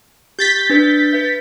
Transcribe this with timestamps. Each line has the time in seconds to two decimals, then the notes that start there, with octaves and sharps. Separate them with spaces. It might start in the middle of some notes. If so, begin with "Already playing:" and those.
0.39 G4 G6 A6 B6
0.70 D4 B4
1.13 B4 E5